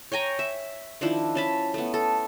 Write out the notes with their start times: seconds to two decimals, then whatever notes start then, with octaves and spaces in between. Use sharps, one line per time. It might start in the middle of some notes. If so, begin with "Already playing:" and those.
0.12 C#5 G5 G#5 A#5
0.39 E5
1.01 D#3 F3 D4 E4
1.35 C#4 A5 B5
1.74 A3 B3
1.94 A4